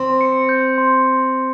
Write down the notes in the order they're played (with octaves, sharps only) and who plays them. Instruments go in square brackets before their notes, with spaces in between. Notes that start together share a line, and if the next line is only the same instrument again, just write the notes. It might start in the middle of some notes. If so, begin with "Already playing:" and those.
Already playing: [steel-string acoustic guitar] C4 [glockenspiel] C6
[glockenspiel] C#7
G6
C6